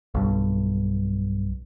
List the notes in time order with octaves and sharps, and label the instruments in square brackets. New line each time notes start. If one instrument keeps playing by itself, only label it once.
[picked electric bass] B1 G2